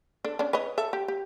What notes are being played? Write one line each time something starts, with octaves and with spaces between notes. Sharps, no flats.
D4 A4
C#4 D4
B4 C#5 D#5
A4 E5
G4
G4